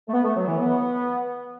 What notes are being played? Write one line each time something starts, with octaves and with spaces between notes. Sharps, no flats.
A3
B3
A3
F#3
E3
B3